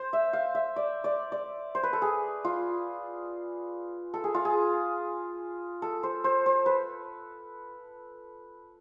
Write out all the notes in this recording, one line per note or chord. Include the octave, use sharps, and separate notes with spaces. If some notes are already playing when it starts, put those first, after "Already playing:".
Already playing: C5
E5
F5
E5
D5
D5
D5
C5
B4
A4
G#4
F4
A4
G#4
F4
G#4
A4
C5
C5
C5
B4